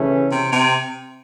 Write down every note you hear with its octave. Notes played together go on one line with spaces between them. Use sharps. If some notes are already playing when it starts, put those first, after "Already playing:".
Already playing: C#3 E3 A3 C#4
C3
C3